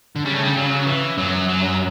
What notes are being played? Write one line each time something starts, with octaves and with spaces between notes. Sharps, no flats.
D3
C#3 G3
A3
G3
F#3
E3
F#2 F#3
F#3